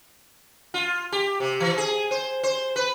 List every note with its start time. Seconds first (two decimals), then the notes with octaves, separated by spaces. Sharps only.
0.74 F4
1.12 G4
1.40 C3
1.60 E3
1.78 G#4
2.11 C5
2.43 C5
2.76 B4